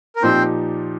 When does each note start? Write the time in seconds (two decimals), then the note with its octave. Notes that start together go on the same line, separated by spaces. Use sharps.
0.16 A#4
0.22 A#2 F3 C4 D#4 G4 C5